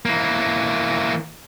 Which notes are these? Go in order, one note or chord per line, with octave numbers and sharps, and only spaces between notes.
E3 A#3